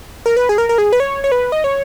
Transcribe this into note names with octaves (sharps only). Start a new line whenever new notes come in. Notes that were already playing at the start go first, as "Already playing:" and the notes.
A#4
B4
G#4
A#4
A#4
G#4
B4
C#5
C#5
B4
D#5
C#5